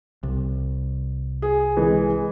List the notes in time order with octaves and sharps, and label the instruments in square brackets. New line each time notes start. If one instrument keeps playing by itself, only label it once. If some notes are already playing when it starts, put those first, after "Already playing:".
[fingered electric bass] C2
[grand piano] G#4
E3 G#3